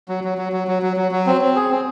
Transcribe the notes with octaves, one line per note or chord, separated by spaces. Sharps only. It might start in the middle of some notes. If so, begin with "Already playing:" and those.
F#3
F#3
F#3
F#3
F#3
F#3
F#3
F#3
C4
C4
G#4
C4